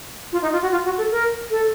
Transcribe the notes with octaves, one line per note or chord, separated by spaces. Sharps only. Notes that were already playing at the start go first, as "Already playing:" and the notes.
F4
D#4
F4
F#4
F4
F#4
A4
A#4
A4